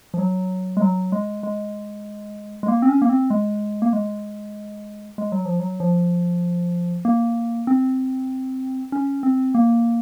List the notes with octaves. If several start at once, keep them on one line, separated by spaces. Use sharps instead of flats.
F3
F#3
G#3
F#3
G#3
G#3
G#3
A#3
C4
C#4
A#3
C4
G#3
A#3
G#3
G#3
F#3
F3
F#3
F3
A#3
C4
C#4
C4
A#3